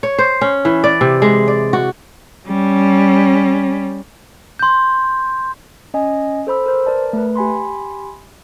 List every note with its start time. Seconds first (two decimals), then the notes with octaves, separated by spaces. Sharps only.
0.03 C#5
0.19 C5
0.41 C#4
0.65 E3
0.84 D5
1.01 C3
1.22 G#3
1.48 D5
1.73 F#4
2.48 G3 C#4
4.59 C6 G6
5.94 C#4 D#5 G#5
6.47 A4 C5 B5 E6
6.66 A#4 C5
6.86 A#4 B4 D5 A5
7.13 A3 B4
7.36 G4 G#5 B5 C6